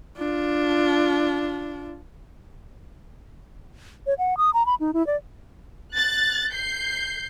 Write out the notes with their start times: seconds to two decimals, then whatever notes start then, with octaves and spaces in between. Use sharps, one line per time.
0.18 D4 F4
4.07 C#5
4.18 F#5
4.37 D#6
4.54 A#5
4.66 B5
4.80 D#4
4.94 E4
5.07 D5
5.93 F#6 A6
6.51 G6 C7